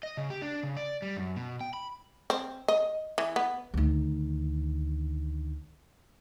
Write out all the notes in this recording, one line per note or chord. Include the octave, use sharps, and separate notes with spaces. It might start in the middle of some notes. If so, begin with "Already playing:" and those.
D#5
C#3
G4
D4
C#3
D5
G3
F#2
B2
G5
B5
C4
D#5
E3
B3
D2 D#3